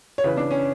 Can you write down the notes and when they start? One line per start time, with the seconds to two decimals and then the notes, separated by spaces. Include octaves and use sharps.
0.18 C#5
0.24 C#3 E3 B4
0.37 D4
0.51 C#4